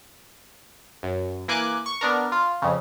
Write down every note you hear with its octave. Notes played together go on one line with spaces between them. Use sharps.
F#2
E3 A#3 G#5 D6 F#6
C#6
B3 D4 A#4
F4
F2 C#3